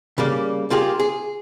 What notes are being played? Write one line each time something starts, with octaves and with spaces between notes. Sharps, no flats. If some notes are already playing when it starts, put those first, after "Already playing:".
C#3 G3 A#3
A#3 F4 G4 G#4
G#4